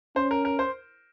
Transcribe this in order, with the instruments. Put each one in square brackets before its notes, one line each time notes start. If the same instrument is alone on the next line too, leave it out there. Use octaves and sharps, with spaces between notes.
[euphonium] C#4 [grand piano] C5
[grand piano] A#4
A#4
C5